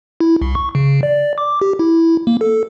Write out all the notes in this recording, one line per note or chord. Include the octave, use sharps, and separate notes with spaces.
E4
C2
C#6
C#3
D5
D6
G4
E4
A#3
A4